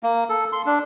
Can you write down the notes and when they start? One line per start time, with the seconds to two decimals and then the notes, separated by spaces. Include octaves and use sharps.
0.03 A#3
0.29 A4
0.53 C6
0.66 D4